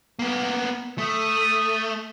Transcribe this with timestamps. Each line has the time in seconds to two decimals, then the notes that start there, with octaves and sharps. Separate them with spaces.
0.19 A#3 B3
0.98 A3 D#6